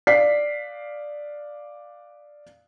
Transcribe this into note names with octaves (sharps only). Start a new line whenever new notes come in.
D5 F5 B6 C7